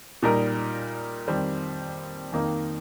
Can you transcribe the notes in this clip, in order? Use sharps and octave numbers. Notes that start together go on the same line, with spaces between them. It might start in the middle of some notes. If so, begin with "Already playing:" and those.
A#2 G3 D#4 A#4
F2 D#3 G3 C4
F2 D#3 A#3 D#4